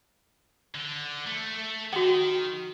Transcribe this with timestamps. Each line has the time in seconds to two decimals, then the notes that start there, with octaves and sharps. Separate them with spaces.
0.75 D3
1.26 A3
1.93 D#3 F#4 G5